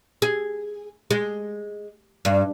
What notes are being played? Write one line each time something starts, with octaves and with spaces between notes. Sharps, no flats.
G#4
G#3
G2